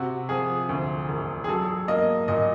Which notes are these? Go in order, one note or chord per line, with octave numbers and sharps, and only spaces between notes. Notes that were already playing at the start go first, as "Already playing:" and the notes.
Already playing: C3 F#4
F3 G#4
D2
E1
G#4
F#3 A4
A#3 D#5
A#2 D#5